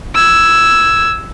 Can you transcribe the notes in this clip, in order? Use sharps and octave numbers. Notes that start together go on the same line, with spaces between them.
E6 G#6